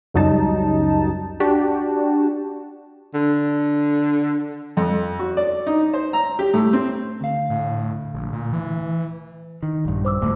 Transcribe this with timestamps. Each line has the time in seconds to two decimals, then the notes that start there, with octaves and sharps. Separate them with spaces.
0.14 C#2 F#2 F#3 G3 D#4 A5
1.40 D4 F#4 G4 A5
3.14 D3
4.77 F2
5.19 F#4
5.37 D5
5.67 D#4
5.94 C5
6.13 A#5
6.39 G4
6.54 A2
6.73 C4
7.21 D2 F5
7.50 A2
8.15 A#1
8.33 A#2
8.53 E3
9.63 D#3
9.85 A#1 G2
10.05 C5 D6 E6
10.21 G1 D2 A2